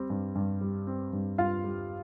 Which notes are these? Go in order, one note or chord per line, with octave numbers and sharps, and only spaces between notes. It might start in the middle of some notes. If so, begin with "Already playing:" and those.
Already playing: G3 C4
G2
G2
G3
C4
G2
G2 F4 F5
G3